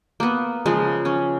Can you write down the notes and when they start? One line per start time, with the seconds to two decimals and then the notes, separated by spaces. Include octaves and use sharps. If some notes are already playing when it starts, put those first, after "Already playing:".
0.20 A#3 B3
0.66 C#3 F3 G#3
1.05 C#4